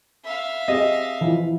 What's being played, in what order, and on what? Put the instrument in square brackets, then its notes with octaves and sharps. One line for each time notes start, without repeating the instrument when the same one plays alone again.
[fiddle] E5 F5
[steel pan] C4 G4 G#4 [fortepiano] D#5
[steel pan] E3 F3 E4